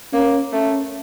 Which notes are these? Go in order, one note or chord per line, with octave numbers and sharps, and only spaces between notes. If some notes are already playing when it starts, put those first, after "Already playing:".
A#3 C#4
A3 C#4